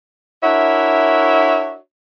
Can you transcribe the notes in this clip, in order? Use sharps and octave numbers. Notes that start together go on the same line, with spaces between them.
D4 E4 F#4 A#4 C#5 E5